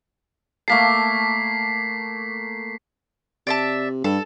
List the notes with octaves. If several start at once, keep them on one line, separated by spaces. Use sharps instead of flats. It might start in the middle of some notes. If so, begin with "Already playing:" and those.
A3 A#3 A5 B6 C7
C3 D5 E5 A5
G2 A4